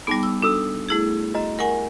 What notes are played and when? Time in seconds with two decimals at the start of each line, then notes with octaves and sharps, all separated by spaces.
0.07 G3 B3 D#4 G#4 D6
0.23 E6
0.42 D4 F#4 A4 E6
0.89 A3 E4 G#4
1.34 F#4 D#5 A#5
1.59 G4 A#4 F#5 G#5 C#6